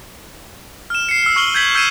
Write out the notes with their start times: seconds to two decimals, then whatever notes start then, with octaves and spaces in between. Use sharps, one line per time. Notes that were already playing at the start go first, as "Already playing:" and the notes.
0.90 F6 E7
1.09 C7 C#7
1.23 E6 C7
1.36 C#6 F6 F#7 G7
1.54 G6 G#6 B6 F#7
1.75 E6 G6 G#6 C7 D#7 E7